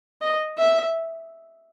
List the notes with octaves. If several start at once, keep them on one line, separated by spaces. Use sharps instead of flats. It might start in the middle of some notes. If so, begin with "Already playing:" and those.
D#5
E5